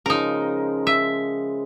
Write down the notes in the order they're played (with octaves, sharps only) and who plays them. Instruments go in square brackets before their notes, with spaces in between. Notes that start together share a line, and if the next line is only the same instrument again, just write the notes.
[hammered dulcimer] C#3 F3 G#3 [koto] D#4 A#4
[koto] E5